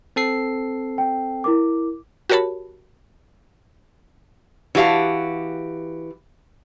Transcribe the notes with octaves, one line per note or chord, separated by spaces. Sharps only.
C4 A4 C7
G5
E4 A#4 D6
F#4 G4 A#4 C#5 A5 B5
E3 F#4 G4 F5 A5